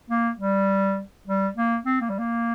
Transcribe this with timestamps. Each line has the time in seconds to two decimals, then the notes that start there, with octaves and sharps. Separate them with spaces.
0.10 A#3
0.39 G3
1.27 G3
1.57 A#3
1.86 C4
2.01 A#3
2.09 G3
2.19 A#3